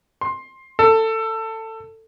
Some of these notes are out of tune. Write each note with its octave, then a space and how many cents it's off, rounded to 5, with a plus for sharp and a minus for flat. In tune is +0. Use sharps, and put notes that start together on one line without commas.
C6 +15
A4 +20